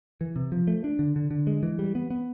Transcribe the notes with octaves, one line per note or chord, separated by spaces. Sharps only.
E3
C3
F3
A3
D4
D3
D3
D3
G#3
E3
G3
B3
B3